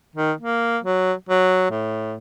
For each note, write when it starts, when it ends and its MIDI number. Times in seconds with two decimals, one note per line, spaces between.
0.15 0.32 51
0.41 0.78 58
0.84 1.13 54
1.29 1.67 54
1.71 2.15 45